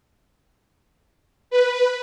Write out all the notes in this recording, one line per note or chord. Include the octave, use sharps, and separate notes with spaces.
B4